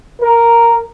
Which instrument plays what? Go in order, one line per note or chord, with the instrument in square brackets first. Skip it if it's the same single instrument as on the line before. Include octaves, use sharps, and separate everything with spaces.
[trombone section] A#4